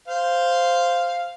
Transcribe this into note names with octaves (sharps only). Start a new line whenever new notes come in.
C5 F5